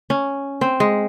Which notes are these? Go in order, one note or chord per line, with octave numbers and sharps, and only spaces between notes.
C#4
C4
G#3